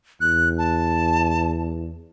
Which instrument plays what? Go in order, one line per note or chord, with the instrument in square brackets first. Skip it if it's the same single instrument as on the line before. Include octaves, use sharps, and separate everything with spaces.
[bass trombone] E2 [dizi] F#6
[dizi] A5